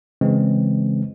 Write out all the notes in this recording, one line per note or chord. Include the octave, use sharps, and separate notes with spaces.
C#3 E3 G#3 C4